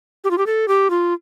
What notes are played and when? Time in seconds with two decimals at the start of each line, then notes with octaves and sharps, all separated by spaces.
0.24 G4
0.31 F4
0.38 G4
0.46 A4
0.68 G4
0.90 F4